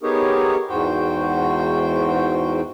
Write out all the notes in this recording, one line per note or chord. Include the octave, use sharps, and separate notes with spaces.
B3 D#4 G4 G#4 A#4 C#5
E2 G#2 F#4 C5 G5